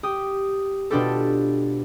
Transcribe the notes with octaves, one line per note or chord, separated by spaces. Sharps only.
G4 D#6
B2 D4 F4 G4 A4